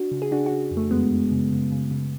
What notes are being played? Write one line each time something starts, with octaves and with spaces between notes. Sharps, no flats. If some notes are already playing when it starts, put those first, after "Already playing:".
Already playing: D4 F#4
C#3
G#4
C#3 D4 F#4
C#3 D4 F#4
F2
A3
F#2 G#3 B3
F#2
C#3
C#3
C#3
C#3